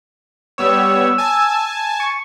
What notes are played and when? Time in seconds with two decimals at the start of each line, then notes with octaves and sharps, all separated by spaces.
0.58 G3 B3 C#5 E6
1.18 G#5 A5
2.00 C#6